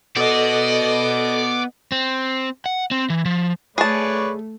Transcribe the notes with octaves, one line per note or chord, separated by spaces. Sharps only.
B3 F#4 A4 D5 D#5
C4
F#5
C4
E3
F3
A3 G#4 B4 C#5 D5 A5